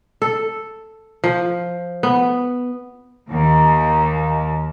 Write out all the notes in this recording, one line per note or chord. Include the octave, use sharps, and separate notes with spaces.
A4
F3
B3
D#2